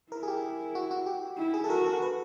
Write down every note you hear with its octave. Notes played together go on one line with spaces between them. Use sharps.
E4 A#4
G#4
G4
F#4
F#4
G4
E4
G#4
A4
F#4 A#4
A4
B4